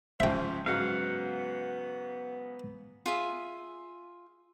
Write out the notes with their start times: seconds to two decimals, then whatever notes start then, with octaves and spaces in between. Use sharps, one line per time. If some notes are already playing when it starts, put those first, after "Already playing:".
0.20 G#2 C#3 F3 C5 E5 G5
0.66 G#2 C#3 F#3 B3 F5 F#5
3.06 F4 G#4 E5